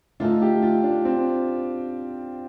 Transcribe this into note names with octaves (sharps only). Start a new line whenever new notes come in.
D3 A3 D#4 F4 A4
G4
F4
D4
C4